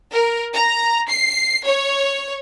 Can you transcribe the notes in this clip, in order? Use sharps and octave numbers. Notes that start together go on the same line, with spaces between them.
A#4
A#5
C7
C#5